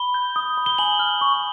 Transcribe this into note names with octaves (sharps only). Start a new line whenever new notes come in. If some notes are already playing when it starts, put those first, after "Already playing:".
Already playing: B5 G7
G6
D#6
B5
G7
G#5 F#7
F6
C#6